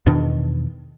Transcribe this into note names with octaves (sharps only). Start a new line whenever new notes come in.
E2 B2 D#3 D4